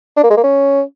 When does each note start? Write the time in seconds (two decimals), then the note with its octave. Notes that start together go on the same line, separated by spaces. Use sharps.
0.17 D4
0.24 A#3
0.30 G#3
0.37 A#3
0.44 C#4